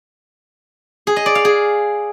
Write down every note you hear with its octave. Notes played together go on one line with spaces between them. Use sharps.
G#4
D#5
D5
F5
G#4